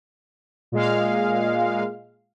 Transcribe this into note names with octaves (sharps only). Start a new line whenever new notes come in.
A#2 G#3 F5